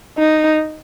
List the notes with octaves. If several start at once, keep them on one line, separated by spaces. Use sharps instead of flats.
D#4